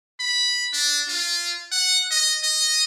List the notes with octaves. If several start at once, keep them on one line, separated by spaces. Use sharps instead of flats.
B5
D4
F4
F#5
D#5
D#5